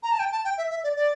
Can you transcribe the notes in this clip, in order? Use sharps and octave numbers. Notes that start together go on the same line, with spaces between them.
A#5
A5
G5
A5
G5
E5
E5
D5
D5